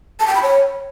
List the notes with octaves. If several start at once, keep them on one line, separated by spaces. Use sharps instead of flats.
A5
G5
B5
C#5